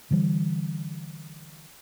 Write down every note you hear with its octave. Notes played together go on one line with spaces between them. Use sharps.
D3 E3 G3